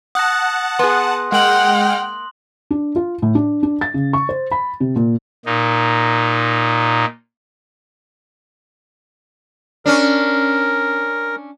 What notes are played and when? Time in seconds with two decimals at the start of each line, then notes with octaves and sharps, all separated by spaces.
0.15 F#5 A5 D#6 F#6 A#6
0.79 B3 G#4 C6
1.32 G#3 A#3 F#5 G5 C6 F6 F#7
2.71 D4
2.96 F4
3.22 A2
3.35 D4
3.63 D4
3.81 A6
3.94 C#3
4.13 C#6
4.29 C5
4.51 B5
4.80 C3
4.96 A#2
5.46 A#2 D#4
9.86 C#4 D4 A#4